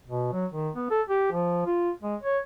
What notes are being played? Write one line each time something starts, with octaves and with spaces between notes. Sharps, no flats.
B2
F#3
D#3
B3
A4
G4
F3
F4
G#3
C#5